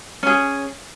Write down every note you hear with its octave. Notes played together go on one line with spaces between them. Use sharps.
C#4 G#4